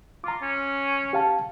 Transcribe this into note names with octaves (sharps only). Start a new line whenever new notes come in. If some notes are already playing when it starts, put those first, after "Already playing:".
F4 A#5 D6
C#4
G4 F5 A5